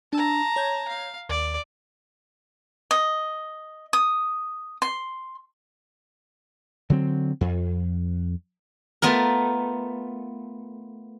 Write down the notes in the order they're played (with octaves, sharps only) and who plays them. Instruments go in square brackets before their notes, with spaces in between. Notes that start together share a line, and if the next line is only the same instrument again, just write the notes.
[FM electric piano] D4 E6 [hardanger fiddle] A5 A#5
[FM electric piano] C#5 G6 G#6
[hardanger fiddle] F5
[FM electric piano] D#2 [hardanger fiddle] D5
[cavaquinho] D#5
D#6
C6
[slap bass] D3 F#3 C4
F2
[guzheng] A3 B3 F4 A#4